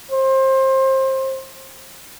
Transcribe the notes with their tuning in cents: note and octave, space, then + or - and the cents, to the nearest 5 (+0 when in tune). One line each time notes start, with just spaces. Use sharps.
C5 +25